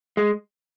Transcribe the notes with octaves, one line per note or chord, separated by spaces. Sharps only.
G#3